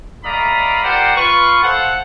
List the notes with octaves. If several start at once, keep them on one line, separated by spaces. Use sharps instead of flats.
A3 D5 D#5 F5 A#5 B5
F4 G4 A#4 C5 D5 F#5
F4 B4 C#6
A4 C5 F5 F#5